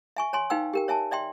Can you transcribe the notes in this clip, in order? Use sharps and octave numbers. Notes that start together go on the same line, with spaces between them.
E5 G#5 C#6
C#5 G#5 C6
D#4 B4 F5 G5 E6
G4 A#4 G5
C#5 E5 G#5 A5
D5 E5 G5 C6